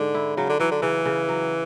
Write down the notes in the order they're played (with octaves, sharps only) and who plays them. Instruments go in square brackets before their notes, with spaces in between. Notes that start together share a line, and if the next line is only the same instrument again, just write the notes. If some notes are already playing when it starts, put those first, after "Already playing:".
Already playing: [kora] G#2 [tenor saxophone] D3
[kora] E4
[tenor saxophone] C#3 [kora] F#3
[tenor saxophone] D3
[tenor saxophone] E3 [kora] F#3
[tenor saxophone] D3
[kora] C#3 [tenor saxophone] E3
[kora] C#3
F#3